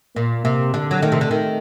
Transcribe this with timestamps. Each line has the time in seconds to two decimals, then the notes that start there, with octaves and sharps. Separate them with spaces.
0.15 A#2 A#3
0.45 C3
0.74 D3
0.91 F#3
1.01 D#3 A3
1.12 C3
1.21 D3
1.31 D#3